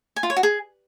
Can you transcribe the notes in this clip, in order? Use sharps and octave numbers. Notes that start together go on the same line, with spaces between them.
G#5
F4
C#5
F#4
G#4